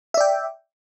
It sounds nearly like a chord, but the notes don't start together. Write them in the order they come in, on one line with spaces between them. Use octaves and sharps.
E5 D5 G5